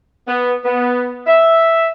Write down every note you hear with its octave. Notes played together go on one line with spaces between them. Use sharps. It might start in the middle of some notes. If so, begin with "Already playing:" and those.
B3
B3
E5